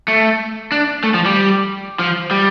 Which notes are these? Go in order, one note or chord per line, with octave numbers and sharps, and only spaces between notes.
A3
D4
A3
F3
G3
F3
G3